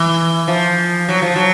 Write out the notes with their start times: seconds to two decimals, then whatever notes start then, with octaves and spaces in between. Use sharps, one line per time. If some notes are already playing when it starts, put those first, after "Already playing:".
Already playing: E3
0.48 F3
1.09 F#3
1.22 F3
1.36 F#3